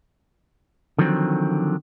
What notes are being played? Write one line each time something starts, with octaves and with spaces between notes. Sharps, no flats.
D3 D#3 F3 F#3 C4